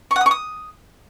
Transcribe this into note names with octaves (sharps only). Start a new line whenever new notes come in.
C#6
F#5
D#6
C#6
D#6